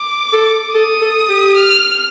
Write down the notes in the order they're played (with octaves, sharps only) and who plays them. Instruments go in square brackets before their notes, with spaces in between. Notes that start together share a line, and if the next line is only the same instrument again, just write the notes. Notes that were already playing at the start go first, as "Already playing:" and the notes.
Already playing: [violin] D6
[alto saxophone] A4
[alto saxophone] A4 [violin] D#6
[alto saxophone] A4
G4
[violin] F6